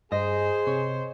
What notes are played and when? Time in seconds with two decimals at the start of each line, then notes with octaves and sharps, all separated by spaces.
0.12 G2 G#4 C5 D#5
0.67 C3 C#5